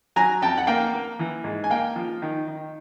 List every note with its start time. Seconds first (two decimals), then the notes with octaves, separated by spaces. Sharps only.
0.16 F#3 G#5 A#5
0.42 F2 G5 A5
0.57 F#5
0.67 A#3 F5 G5
0.94 A#3
1.19 E3
1.44 G#2
1.64 G#5
1.70 A#3 F5 G5
1.96 F3
2.22 D#3
2.47 D#3